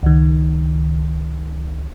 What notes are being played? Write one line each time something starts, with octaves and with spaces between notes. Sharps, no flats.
C#2 D#3